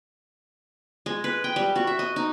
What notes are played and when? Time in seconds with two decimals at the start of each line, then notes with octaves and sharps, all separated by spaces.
1.06 G#3
1.24 B4
1.44 G5
1.56 G3
1.76 F#4
1.87 E5
1.99 D#5
2.16 D#4